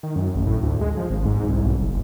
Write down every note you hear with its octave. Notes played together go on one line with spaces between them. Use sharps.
D#3
F#2
A1
A2
D2
G#3
F3
G#1
G#2
C2
B1
F#1